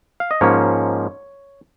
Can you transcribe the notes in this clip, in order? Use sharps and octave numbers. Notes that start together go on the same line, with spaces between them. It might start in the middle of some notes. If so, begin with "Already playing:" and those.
F5
D#5
G#2 F3 A#3 C#4 C#5